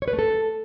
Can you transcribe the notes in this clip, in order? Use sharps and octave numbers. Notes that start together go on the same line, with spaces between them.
C#5
B4
A3
A4